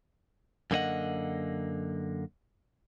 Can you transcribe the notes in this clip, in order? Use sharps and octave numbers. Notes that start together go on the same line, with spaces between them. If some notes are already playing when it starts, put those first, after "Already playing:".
F#2 D3 A#3 F4 D#5 F#5